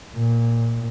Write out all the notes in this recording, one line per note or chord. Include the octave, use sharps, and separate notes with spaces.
A#2